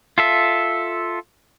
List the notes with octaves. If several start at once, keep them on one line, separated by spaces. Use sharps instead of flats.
F4 A4 E5